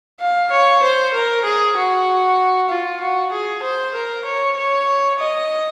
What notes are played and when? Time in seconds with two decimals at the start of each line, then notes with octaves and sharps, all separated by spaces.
0.20 F5
0.51 C#5
0.83 C5
1.14 A#4
1.45 G#4
1.77 F#4
2.69 F4
3.00 F#4
3.32 G#4
3.62 C5
3.94 A#4
4.25 C#5
4.56 C#5
5.19 D#5